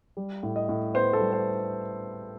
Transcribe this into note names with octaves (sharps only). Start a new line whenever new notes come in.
G3
A2
D#5
A2
B3 C5
A4
G3
C5